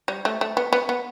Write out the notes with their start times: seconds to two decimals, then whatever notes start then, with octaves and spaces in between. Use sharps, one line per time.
0.08 G3
0.25 A3
0.41 A3
0.57 B3
0.73 B3
0.89 B3